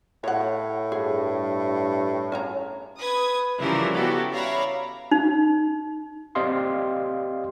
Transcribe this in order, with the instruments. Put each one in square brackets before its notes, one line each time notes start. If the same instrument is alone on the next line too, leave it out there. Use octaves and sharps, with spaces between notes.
[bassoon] A2 [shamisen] C#5 F#5
[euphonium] G2 [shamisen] G#4
[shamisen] C#4 G#5 A#5
[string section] B4 D#6 G#6
C#3 E3 F3 G3 E4 A#4
B3 E4 F#4 G4 A4
C#5 D5 E5 F5 A#5 B5
[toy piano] D#4
[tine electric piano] C4 G4 D5 D#5 F5 C6